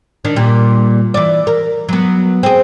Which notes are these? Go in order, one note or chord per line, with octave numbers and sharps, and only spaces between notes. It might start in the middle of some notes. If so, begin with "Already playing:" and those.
D#3 D4
A#2 G3
E3 D5
A#4
F#3 B3
C4 G#4